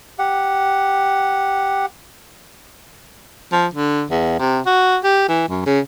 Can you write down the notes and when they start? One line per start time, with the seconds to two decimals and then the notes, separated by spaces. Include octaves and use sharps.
0.19 G4 F#5
3.52 F3
3.74 D3
4.10 E2
4.39 C3
4.66 F#4
5.04 G4
5.29 E3
5.49 F#2
5.66 C#3